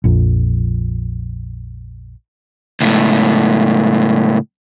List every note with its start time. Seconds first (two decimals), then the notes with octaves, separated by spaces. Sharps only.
0.04 A#1 F2
2.81 C#2 A2